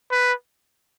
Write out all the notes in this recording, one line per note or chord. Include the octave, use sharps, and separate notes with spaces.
B4